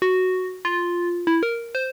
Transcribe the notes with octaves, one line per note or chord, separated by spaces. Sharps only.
F#4
F4
E4
A#4
C5